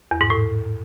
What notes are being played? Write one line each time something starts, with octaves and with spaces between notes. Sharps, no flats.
E2
G#2
A2